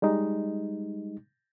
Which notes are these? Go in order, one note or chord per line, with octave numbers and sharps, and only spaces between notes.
G3 G#3 D#4